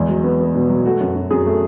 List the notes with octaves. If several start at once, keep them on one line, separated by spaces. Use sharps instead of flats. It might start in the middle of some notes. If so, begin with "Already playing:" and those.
Already playing: E2 G#3
F#3
B3
B3
B2
F#3
A3 F#4
F#2
F#2
F#2 G#4
A3